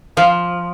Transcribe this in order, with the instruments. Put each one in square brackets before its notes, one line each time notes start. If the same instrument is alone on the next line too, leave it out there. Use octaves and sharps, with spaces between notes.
[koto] F3 [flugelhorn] F5